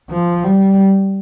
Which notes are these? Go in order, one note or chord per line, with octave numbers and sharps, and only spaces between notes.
F3
G3